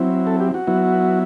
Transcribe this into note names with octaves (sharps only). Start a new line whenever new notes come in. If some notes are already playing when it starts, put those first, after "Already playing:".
Already playing: F#3 C4 E4
A4
G4
F#4
F#3 B3 E4